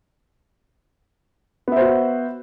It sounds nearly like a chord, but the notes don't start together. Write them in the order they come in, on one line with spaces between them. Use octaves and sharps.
B3 E5 C5 F#4